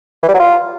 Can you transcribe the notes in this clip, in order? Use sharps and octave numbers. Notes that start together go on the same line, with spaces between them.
E3
G3
F#3
F4